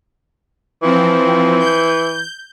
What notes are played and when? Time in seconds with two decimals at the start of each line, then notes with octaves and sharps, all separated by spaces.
0.82 E3 F3 C4
1.59 G6